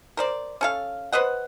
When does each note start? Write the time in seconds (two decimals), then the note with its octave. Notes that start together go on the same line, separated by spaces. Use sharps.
0.17 A#4 C5 D5
0.61 C#4 A4 F5
1.13 B4 C5 D#5 F#5